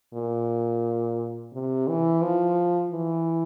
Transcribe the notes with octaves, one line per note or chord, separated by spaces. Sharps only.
A#2
C3
E3
F3
E3